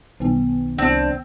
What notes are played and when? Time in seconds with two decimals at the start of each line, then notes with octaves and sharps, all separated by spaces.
0.20 B1 D#3 B3
0.78 C2 C4 D4